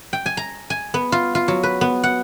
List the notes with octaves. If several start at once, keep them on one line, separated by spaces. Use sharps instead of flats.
G5
G#5
A#5
G#5
B3
F4
F4
F#3
B4
B3
F#5